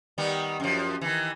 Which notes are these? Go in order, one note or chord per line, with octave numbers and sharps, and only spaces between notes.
D#3 G3 B3
F#2 F3
D#3 E3